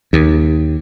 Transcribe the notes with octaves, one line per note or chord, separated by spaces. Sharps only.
D#2